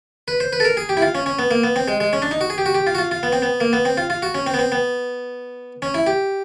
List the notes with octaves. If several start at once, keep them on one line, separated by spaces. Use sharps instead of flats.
B4
C5
B4
A4
A#4
G#4
G4
E4
F4
C#4
C#4
B3
A#3
B3
C4
G#3
G#3
C#4
D4
D#4
F#4
G#4
G4
F#4
G4
F4
F#4
F4
F4
B3
C4
B3
A#3
B3
C4
F4
F4
F#4
C#4
C4
B3
C4
B3
C#4
E4
G4